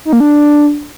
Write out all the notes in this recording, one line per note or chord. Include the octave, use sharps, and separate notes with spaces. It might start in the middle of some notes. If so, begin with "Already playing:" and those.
D#4
A#3
D4